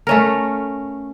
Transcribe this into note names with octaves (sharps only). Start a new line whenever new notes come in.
A3 C#4 A#4